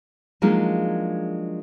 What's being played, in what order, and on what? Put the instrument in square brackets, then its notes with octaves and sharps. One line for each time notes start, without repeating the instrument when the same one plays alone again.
[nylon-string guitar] F3 F#3 G#3 A#3 D4 D#4